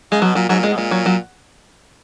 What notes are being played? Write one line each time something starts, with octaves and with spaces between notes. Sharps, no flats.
C#3 G#3
B2 F#3
A#2 F#3
G#2 F#3
A#2
G#2 G#3
B2
A#2 G#3
F#3
F#3